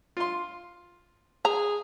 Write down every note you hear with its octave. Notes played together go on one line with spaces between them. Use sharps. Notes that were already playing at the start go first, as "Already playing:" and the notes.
F4 C6
G#4 A#5